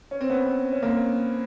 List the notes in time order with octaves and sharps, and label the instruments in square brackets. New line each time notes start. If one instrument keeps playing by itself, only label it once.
[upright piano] C#4
C4
B3 C#4
C#4
A#3 C4